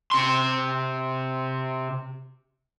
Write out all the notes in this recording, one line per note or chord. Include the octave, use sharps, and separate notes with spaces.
C3 C6